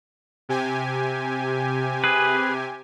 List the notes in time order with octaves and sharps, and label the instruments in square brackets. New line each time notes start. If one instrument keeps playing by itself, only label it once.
[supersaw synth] C3 G4 G#5
[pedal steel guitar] G#4 B4